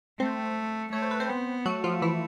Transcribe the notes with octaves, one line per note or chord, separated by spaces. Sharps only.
A3 C4 C5
A3 C#5
C5
B4
C4 C5
B3
F#3 A3 F#4
F3 F4
E3 E4